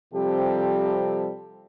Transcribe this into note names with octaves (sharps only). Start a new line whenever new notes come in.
C3 F3 G3 C4 G4 A4